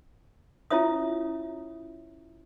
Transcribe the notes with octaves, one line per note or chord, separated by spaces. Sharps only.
C#4 E4 F4 C#5 E5 D#6